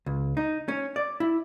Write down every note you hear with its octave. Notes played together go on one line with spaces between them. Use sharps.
C#2
D#4
C#4
D5
E4